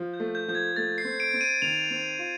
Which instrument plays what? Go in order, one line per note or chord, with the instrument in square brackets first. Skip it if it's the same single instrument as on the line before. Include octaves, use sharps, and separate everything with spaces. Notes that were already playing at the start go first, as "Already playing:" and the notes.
Already playing: [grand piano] F3
[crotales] G6
[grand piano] A3
[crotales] G6
[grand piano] F3 [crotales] G6
[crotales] G#6
[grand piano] A3 [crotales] A6
[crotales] C7
[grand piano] C4
[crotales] D7
[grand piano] C4
[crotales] D#7
[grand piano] D#3 [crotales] F7
[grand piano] C4
F4